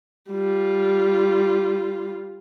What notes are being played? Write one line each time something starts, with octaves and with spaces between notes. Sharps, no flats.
G3 F4